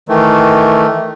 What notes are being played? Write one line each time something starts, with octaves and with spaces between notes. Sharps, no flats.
D#3 E3 A3